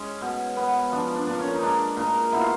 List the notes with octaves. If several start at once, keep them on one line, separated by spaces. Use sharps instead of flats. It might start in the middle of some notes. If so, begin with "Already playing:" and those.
Already playing: G#3 C#4
B2
B3
F3 D4
D4
A#2 D4
C#4
D#4
G#3 D4
A#2 D#4
B2 E4
F4